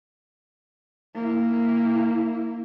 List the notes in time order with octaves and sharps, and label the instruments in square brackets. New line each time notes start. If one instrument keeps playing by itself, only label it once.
[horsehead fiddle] A#3 E4